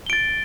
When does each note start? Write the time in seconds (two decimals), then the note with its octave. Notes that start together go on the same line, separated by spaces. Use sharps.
0.06 G7
0.10 D7
0.13 A6